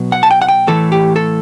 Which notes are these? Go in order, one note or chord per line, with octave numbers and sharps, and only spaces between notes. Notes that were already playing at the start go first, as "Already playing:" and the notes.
Already playing: B2 F#3 B3
F#5
A5
G5
F#5
G5
A2 E3 A3 A4
G4
A4